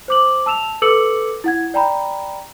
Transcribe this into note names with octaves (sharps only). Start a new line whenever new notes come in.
C5 D6 F#7
A5 E6 E7 F7
A4 B4 D6 E6 C#7 F#7
E4 F#5 G#6
D5 G5 A#5 B5